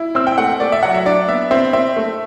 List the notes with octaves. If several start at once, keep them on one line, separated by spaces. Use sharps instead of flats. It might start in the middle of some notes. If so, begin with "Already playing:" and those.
Already playing: E4
C4 E6
G5
A3 F#5
A3 D5
E5
F#3 F#5
E5
D4 D5
B3 E5
C4 E5
C4 E5
A3